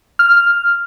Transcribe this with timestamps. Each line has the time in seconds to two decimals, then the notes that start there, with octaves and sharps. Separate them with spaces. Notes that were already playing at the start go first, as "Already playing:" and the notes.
0.19 F6